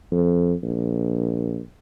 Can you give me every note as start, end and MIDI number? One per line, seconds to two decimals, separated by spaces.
0.11 0.53 41
0.63 1.59 34